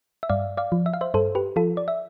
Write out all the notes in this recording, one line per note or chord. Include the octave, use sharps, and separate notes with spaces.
E5
G2 D5 F5
D5 F5
F3
E5
F5
C5 E5
G2 A4 C5
G4 B4
F3 F4 A4
D5
E5